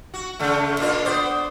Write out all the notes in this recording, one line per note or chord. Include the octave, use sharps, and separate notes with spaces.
F#4
C#3 A3
A#2 D4 F4
B3 C5 D5